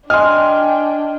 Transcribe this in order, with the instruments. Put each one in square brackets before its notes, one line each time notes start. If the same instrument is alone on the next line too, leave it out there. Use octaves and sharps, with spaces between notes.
[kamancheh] D4 G5 [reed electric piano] D#5 C6 [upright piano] G#5 F6